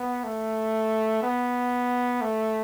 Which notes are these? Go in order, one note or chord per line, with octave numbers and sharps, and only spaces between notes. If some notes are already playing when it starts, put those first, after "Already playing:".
Already playing: B3
A3
B3
A3